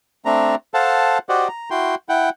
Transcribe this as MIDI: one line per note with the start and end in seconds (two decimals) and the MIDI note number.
0.25 0.55 57
0.25 0.55 60
0.25 0.55 62
0.25 0.55 82
0.74 1.18 69
0.74 1.18 72
0.74 1.18 77
0.74 1.18 78
0.74 1.18 81
1.29 1.48 66
1.29 1.48 67
1.29 1.48 72
1.29 1.48 74
1.29 1.48 75
1.29 1.48 78
1.48 1.70 82
1.70 1.95 64
1.70 1.95 66
1.70 1.95 79
1.70 1.95 84
2.09 2.30 64
2.09 2.30 78
2.09 2.30 79